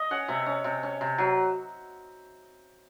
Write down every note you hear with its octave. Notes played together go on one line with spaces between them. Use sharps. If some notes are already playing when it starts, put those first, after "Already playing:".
Already playing: D#5
C#4 F#5
C3 E5
C#4
C3
C#4
C3
F#3